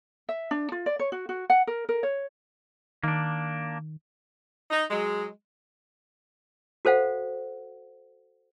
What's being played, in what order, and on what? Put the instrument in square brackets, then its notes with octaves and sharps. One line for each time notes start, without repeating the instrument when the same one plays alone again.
[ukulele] E5
D4
F4
D5
C#5
F#4
F#4
F#5
A#4
A#4
C#5
[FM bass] D#3 [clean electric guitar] A#3 D4
[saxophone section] D#4
F#3 G#3
[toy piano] F#4 A4 C5 F5 F#5